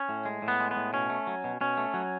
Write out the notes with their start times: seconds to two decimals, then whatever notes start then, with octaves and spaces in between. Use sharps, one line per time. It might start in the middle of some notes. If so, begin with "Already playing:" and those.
Already playing: C#4
0.09 A2
0.25 G#3
0.42 A2
0.48 B3
0.60 G#3
0.71 B3
0.77 A2
0.93 B2 C#4
1.10 A3
1.27 F#3
1.44 B2
1.61 B2 C#4
1.77 A3
1.94 F#3